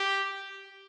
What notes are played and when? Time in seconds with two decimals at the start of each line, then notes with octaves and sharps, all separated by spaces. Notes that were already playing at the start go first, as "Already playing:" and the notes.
Already playing: G4